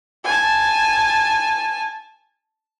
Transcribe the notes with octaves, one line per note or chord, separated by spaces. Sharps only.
G#5 A5